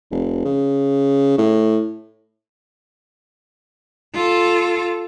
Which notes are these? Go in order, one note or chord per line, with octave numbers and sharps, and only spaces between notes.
F1
C#3
A2
F4 A4